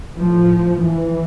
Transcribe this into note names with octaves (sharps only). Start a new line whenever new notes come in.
A2 F3
E3